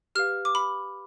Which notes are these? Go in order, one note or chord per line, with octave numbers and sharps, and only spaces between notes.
G4 B4 F5 F6
D6
B5